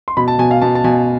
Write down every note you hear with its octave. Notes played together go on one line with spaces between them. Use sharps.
C6
B2 B5
A5
B2 G#5
F5
B2 A5
A5
B2 G#5